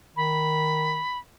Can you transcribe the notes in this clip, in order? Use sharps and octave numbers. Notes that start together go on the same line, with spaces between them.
D#3 B5